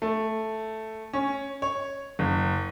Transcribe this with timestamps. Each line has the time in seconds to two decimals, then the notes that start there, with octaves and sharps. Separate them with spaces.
0.02 A3
1.13 C#4
1.62 C#5
2.19 F#1